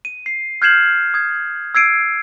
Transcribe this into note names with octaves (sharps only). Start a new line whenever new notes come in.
D#7
C7
F6 G6 G#6 C7 E7 F#7
D#6 G#6
E6 G#6 C7 D7 D#7